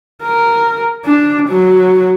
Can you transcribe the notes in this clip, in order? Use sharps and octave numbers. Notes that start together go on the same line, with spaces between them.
A#4
D4
F#3